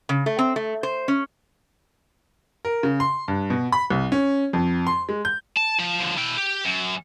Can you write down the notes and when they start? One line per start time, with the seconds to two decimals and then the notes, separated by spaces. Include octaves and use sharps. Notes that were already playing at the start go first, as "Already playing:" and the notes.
0.09 C#3
0.26 A3
0.39 C4
0.56 A3
0.83 C5
1.08 C#4
2.65 A#4
2.83 C#3
3.00 C6
3.28 G2
3.50 B2
3.72 B5
3.90 C2
4.12 C#4
4.53 F2
4.87 C6
5.09 G#3
5.25 G6
5.57 A5
5.79 F3
6.00 D3 F3
6.17 E4 G5
6.37 G4
6.65 F#2